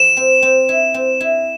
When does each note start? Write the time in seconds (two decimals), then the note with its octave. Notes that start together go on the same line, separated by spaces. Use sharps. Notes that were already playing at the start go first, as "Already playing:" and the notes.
Already playing: F3 E7
0.17 C4
0.42 C4
0.69 E4
0.94 C4
1.21 E4